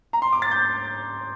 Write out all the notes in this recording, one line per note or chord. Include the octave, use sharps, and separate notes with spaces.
A#5
C6
D6
A6
G6